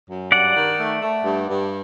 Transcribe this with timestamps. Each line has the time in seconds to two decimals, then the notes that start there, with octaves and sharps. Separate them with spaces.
0.09 F#2
0.32 G2 D5 F#5
0.55 D#3
0.79 A3
1.02 A3
1.24 G2
1.48 G2